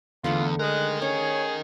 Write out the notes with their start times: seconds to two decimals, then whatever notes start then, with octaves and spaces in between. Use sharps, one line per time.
0.24 E2 D3 A3 F4 F#5
0.59 G#3 A#4 D#5 F#6
1.02 C#4 G#4 C#5